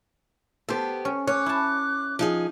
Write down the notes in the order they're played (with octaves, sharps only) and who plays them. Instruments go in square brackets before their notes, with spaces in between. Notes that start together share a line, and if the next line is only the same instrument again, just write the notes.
[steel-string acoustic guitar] B3 G4 [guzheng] A4 C5
[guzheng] C#4
[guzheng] C#4 [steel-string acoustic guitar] C#5 [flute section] D6 F#6
[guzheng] E4 A5
[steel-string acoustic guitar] F3 D#4 G#4